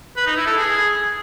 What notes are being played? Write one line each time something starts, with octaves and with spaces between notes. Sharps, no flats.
B4
D#4
E4
A4
G#4